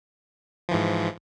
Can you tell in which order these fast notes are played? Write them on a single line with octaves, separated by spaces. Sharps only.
F3 E3 G#2